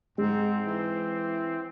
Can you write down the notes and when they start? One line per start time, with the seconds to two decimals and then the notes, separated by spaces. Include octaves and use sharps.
0.18 G#2 G#3 C4
0.66 E3